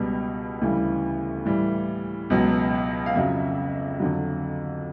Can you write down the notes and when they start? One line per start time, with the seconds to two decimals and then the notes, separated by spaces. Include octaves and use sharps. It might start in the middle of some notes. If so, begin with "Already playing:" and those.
Already playing: C#2 B2 G3
0.61 D2 C#3 E3 G3
1.45 A2 E3 G3
2.30 C#2 B2 F#3
3.06 F5
3.15 F2 C#3 F#3 E5
4.00 F2 D3 F#3